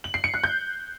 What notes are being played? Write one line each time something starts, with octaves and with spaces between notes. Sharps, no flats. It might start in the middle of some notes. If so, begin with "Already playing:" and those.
F#7
C7
C#7
F#6
G6